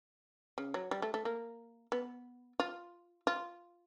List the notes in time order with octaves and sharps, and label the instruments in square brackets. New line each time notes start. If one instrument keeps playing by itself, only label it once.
[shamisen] C#3
F#3
G3
A3
A3
A#3
B3
F4
F4